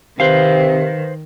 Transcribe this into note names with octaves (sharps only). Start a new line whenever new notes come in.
C3 D#3 C4 B4 C5 F5